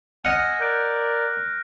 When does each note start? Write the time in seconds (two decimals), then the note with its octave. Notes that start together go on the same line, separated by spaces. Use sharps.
0.25 D#5 F#5 G#5 E6 F6 A#6
0.60 A#4 D5 F#6 G6 D7